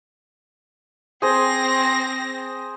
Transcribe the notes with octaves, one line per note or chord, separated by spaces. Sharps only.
C4 G#4 C5 A#6